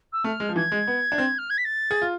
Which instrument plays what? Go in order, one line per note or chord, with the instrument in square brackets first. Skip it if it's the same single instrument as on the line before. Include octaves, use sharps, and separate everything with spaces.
[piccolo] E6
[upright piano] A3 [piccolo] F6
[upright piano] G#3
F3
[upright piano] E3 [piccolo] G#6
[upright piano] G#3
B3
D4
C4
[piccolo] F6
G#6
B6
A6
[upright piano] G#4
F4